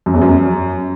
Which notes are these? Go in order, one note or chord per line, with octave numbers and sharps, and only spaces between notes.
F#2
E2
F#2